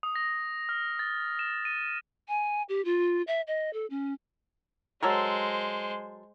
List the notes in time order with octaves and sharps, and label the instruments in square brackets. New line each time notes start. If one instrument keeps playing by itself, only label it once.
[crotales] D#6
A#6
F6
A6
E7
D#7
[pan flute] G#5
G4
F4
E5
D#5
A4
C#4
[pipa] F#3 A4 A#4 [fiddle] G#3 C5